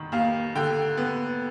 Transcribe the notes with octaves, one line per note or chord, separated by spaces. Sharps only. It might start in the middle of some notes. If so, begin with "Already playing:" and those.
Already playing: F1 D#3
D#2 F5
D3 G5
B3